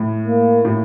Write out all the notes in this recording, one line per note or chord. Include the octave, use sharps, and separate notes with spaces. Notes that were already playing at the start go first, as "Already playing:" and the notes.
Already playing: A2
A#3
A2